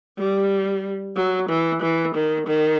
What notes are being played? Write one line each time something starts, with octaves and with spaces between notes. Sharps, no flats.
G3
F#3
E3
E3
D#3
D#3